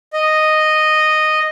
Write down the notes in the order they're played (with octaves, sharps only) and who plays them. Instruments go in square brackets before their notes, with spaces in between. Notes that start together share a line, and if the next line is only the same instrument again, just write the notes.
[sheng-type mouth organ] D#5